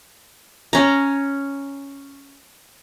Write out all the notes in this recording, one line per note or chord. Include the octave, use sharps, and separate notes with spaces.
C#4 A#5